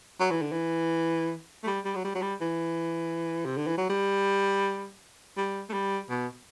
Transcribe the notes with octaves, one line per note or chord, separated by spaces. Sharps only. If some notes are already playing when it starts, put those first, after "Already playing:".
F#3
E3
D3
E3
A3
G3
G3
F#3
G3
F#3
G3
E3
C3
D3
E3
F#3
G3
G3
A3
G3
B2